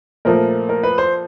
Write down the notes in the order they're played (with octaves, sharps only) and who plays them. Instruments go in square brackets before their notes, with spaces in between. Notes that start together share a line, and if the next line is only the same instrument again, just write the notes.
[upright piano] A#2 F3 A3 [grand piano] A#4
[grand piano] A#4
B4
C5